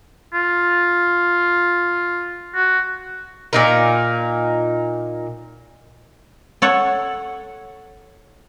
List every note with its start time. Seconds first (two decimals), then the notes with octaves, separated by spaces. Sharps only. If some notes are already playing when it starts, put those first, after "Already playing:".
0.34 F4
2.55 F#4
3.53 A#2 D#4 A#4
6.62 A4 C#5 F#5